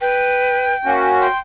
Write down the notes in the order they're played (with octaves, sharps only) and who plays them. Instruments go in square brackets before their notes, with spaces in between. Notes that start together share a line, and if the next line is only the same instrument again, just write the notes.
[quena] B4 [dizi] G5
[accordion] A#3 C#4 F#4
[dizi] G5 [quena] C6